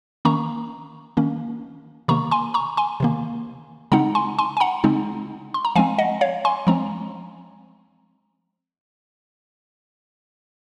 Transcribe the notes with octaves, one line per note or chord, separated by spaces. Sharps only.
D#3 A#3 C#4 A#5 C#6
D#3 A#3 C#4
C3 D#3 A#3 A#5 C#6
G#5 C6
A#5 C#6
G#5 C6
C3 D#3 A#3
C#3 G#3 C4 D#4 F#5 A#5
G#5 C6
G#5 C6
G#5
F#5 A#5
C#3 G#3 C4 D#4
C6
A#5
F3 G#3 C4 F5 G#5
D#5 F#5
C#5 F5
G#5 C6
F3 G#3 C4 A#5